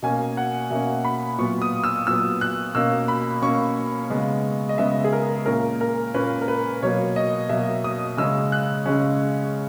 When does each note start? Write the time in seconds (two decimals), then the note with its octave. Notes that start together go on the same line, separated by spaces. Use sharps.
0.03 B2 A#3 C#4 G#5
0.37 F#5
0.70 B2 A#3 C#4 E5
1.05 B5
1.38 A#2 F#3 B3 C#6
1.62 D#6
1.84 E6
2.07 A#2 F#3 B3 E6
2.41 F#6
2.75 B2 A#3 C#4 E6
3.08 B5
3.42 B2 A#3 C#4 C#6
4.10 C#3 G#3 B3
4.69 D#5
4.78 C#3 G#3 B3 E5
5.04 G#4
5.13 A#4
5.46 A#2 A#3 C#4 A#4
5.81 A#4
6.14 A#2 A#3 C#4 B4
6.41 A#4
6.48 B4
6.83 B2 F#3 A#3 C#5
7.16 D#5
7.49 B2 F#3 A#3 E5
7.84 D#6
8.17 C#3 G#3 C#4 E6
8.52 F#6
8.86 C#3 G#3 C#4